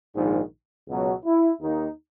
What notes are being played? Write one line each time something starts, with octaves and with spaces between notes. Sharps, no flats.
A#1 G#2 D#3
C#2 B2 F#3 B3
E4
D#2 D#3 A#3 D#4